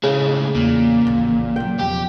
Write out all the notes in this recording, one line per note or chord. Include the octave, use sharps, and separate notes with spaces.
A2 C#3 G#3
E2 A#2
A1 D#2
E3 F#3 G5
E1 F3 G4